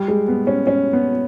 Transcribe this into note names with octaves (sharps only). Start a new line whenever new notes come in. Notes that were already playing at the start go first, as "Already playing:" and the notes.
Already playing: G3
G#3
B3
C#4
C#4
B3